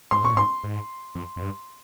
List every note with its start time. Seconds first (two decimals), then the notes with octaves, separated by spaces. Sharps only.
0.11 G#2 C6
0.23 A#2 C#6
0.34 G#2 C6
0.63 G#2
1.15 F2
1.36 F2
1.42 G2